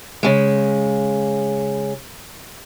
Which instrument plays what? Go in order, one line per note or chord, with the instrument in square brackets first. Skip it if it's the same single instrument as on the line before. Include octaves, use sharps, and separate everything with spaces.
[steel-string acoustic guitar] C#3 G#3